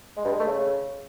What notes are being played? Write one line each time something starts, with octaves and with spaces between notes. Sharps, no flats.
G#3
G2
G#3
A3
C#3